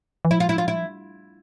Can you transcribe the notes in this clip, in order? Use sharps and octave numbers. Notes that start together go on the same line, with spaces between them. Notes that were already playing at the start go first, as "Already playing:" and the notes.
E3
F3 E4
F4
E4
F4
E4